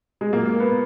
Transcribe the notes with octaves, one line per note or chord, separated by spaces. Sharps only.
G#3
A#2 F#3 A#3
A#3
B3